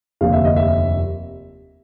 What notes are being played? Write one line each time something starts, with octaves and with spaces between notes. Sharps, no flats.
F1 D#2 D3 F3 F5
E5
D#5
E5